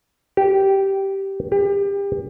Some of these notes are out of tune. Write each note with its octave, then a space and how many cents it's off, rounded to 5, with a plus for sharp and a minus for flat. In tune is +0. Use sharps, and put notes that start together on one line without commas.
G4 -10
G4 +30